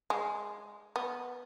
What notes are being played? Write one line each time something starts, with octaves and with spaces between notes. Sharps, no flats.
G#3
B3